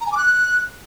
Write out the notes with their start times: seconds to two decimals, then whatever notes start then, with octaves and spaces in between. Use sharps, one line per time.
0.01 A#5
0.06 G#5
0.12 D6
0.17 F#6